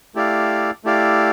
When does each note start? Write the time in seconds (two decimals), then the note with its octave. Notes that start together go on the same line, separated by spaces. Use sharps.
0.15 A3 E4 G4 D5 F5
0.84 A3 E4 G4 D5 F5